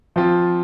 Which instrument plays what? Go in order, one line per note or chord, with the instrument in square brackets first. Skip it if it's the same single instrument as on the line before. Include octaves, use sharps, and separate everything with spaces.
[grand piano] F3 C4 F4